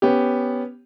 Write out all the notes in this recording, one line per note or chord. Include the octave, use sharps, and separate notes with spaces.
B3 C#4 G4